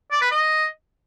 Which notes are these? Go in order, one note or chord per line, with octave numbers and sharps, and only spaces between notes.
D5
B4
D#5